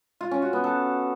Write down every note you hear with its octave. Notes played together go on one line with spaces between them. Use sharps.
F4
C#4
F#4
B3
A4